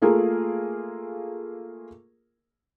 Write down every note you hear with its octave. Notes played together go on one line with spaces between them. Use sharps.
A3 A#3 F4 G#4 A#4